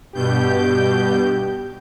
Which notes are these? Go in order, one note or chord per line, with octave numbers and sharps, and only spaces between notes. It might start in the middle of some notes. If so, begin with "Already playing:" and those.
G2 B2 G4 G6